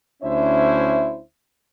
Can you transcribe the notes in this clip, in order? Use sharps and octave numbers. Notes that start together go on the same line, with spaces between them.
D2 C#4 D4 E4 C5 E5